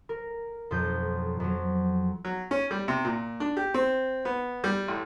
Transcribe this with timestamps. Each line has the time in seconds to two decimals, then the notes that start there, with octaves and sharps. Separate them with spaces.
0.09 A#4
0.71 B1 F2 D#6 G6
1.40 F2 F#3
2.25 F#3
2.51 C#4
2.71 G3
2.88 C3
3.05 A#2
3.40 D4
3.57 G4
3.74 C4
4.25 B3
4.64 G3
4.88 A1